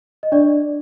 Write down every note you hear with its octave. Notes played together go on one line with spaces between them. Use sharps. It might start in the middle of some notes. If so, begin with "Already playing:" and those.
D#5
D4 D5